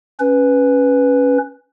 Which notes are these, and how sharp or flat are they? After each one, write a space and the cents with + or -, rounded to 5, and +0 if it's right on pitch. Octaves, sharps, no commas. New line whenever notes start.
C#4 +0 B4 +0